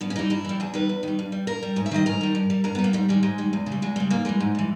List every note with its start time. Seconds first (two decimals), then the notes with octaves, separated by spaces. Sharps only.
0.01 G2 B3
0.10 C#4
0.16 E3 G3 D#4
0.30 G2 E4
0.44 E3 G3
0.60 E2 G#4
0.74 D#3 G3 B4
0.89 E2
1.03 D#3 G3
1.19 G2
1.32 G3
1.47 G2 A#4
1.63 G3
1.76 G#2 C#5
1.86 E5
1.91 D#3 G3 D#5
2.06 G#2 A#4
2.21 D#3 G3
2.35 G2
2.50 G3
2.64 G2 A#4
2.75 G3 B3
2.84 A#3
2.93 G#2 G3
3.08 D#3 G3 G#3
3.23 G#2 G#3
3.38 D#3 G3
3.53 E2
3.66 C#3
3.72 G3
3.82 E2 G#3
3.96 C#3 G3
4.10 G#2 A#3
4.25 E3 G3 G#3
4.40 G#2
4.55 E3 G3